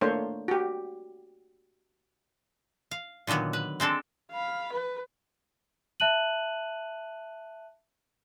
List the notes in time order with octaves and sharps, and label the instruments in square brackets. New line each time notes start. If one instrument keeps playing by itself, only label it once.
[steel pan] A3 A#3 D4 A4 C5 C#5
F#4 G4
[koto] F5
A#2 D3 D#3 F#3 B3
B4
G#3 C4 D4 A4
[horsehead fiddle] F5 B5
B4
[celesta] E5 A5 F#6 D#7 F#7